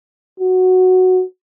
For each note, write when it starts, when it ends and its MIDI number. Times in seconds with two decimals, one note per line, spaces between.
0.40 1.23 66